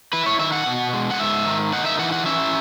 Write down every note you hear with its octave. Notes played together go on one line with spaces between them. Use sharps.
E4 B4
C#5
D#3 E5
F#5
B2
G#3
F#5
G#2 E5
D#3
D#4 F#5
E5
E3 F#5
F#5
C#4 E5